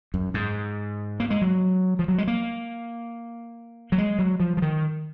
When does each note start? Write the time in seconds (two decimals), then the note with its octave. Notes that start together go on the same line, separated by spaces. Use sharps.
0.14 F#2
0.34 G#2
1.20 A#3
1.30 G#3
1.42 F#3
1.99 F3
2.08 F#3
2.18 G#3
2.27 A#3
3.92 F#3
3.98 G#3
4.19 F#3
4.40 F3
4.57 F3
4.62 D#3